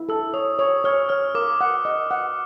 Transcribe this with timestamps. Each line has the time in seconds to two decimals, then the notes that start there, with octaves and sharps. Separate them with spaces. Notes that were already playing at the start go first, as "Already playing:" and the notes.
Already playing: E4
0.09 A4 E6
0.34 C#5 D#6
0.59 C#5 D#6
0.84 C#5 F6
1.09 C#5 F6
1.35 A#4 D6
1.61 F#5
1.85 D#5
2.11 F#5